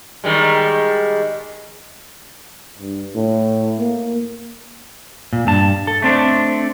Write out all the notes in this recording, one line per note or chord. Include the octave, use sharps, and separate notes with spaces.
D#3 G3 G#3
G2
A2
A#3
A#2
G2 A5
A4
A3 C4 D4